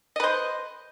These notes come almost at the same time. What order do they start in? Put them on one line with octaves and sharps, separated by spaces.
D#5 B4 C5